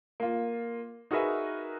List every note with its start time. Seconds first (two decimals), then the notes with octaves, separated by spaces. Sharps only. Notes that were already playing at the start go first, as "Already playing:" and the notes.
0.20 A#3 F4
1.11 D#4 F#4 G#4 A#4 B4 E5